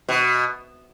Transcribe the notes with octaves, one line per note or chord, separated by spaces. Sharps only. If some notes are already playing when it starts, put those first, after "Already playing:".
B2